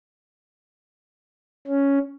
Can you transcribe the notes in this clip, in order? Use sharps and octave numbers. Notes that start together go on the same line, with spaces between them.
C#4